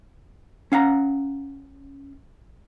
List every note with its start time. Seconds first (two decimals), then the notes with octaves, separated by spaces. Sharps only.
0.72 C#4 F5 F#5 A#5